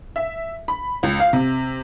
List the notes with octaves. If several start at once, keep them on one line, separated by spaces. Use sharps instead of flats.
E5
B5
C#2
F5
C3